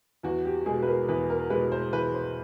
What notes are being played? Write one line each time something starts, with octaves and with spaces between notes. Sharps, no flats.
E2 F#4
G4
B2 G#3 G#4
B4
A#4
E2 B4
A#4
B2 G#3 B4
C5
E2 B4
C5